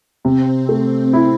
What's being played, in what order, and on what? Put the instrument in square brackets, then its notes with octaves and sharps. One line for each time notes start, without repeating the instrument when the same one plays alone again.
[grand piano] C3 [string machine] C4
[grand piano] A3
E4